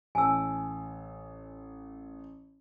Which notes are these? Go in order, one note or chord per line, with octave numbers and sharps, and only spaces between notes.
A1 G#5 A5 E6